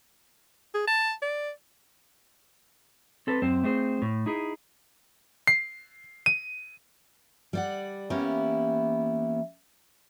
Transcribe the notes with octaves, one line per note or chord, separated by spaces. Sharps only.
G#4
A5
D5
C4 A4 B4
F#2 C4 C5
A3 C4 G#4 C5
A2
D#4 E4 G#4
C7
D#7
G3 D5 F#5
E3 A#3 B3 C#4 E4 G4